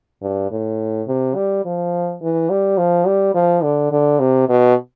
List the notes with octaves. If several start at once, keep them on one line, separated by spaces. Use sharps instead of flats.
G2
A2
C3
G3
F3
E3
G3
F3
G3
F3
D3
D3
C3
B2